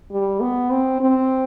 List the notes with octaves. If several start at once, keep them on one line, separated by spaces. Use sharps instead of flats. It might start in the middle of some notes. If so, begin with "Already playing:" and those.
G3
B3
C4
C4